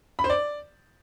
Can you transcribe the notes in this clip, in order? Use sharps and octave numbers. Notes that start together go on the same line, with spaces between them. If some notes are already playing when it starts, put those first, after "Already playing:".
B5
C5
D5